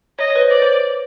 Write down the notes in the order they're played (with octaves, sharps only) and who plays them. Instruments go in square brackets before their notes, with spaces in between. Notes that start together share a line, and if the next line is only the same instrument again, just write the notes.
[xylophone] C#5 [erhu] D#5
[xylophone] C#5
B4
C5
[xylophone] C#5 [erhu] D5
[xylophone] C5